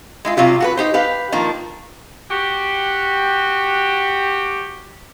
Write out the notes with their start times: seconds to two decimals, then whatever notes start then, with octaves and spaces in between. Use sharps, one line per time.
0.25 G#3 E4 F4
0.37 C3 F#3 F4 G4
0.60 F#4 A4 B4
0.77 D#4 G4 C5
0.94 G4 B4 F5
1.32 D#3 F3 A#3 D4
2.30 F#4 G4